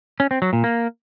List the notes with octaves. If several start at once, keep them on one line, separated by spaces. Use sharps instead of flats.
C#4
C4
F#3
A#2
A#3